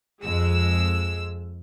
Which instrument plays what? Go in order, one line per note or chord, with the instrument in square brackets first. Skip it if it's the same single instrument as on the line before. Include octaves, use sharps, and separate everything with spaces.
[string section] F2 G#3 E6